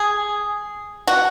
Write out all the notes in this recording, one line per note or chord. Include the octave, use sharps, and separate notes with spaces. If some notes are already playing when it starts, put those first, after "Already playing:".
Already playing: G#4
F#4